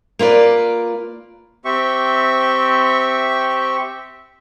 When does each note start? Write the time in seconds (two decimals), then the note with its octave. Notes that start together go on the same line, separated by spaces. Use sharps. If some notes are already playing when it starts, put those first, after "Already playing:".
0.19 A#3 F4 B4 D5
1.65 C4 G4 E5 C#6